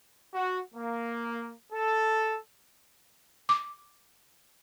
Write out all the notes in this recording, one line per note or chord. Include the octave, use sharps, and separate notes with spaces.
F#4
A#3
A4
D6